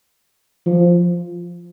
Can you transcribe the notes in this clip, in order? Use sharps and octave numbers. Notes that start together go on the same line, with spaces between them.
F3